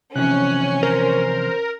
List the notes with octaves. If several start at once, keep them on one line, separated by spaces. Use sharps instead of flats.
C3 E3 F3 C#4 F#6
A#4 C5